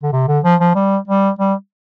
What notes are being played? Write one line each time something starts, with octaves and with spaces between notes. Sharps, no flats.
D3
C3
D3
F3
F3
G3
G3
G3